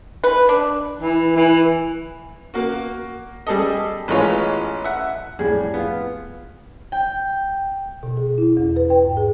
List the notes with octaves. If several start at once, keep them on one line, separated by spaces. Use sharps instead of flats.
B4
D4
E3
E3
A#3 F#4
G3 G#4 A4 D#5
A1 E3 G#3 F4 C#5 G#5
E5 F#5
F2 A2 G3 G#4
B3 F4
G5
B2
G#4
E4
E2
B4
G5
G#2
G#4